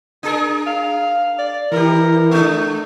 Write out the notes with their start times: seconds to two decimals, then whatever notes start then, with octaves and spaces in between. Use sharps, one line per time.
0.23 D4 G#4 A#4
0.67 F5
1.39 D5
1.72 E3 D#4 G4 A#4
2.31 G#3 A3 D4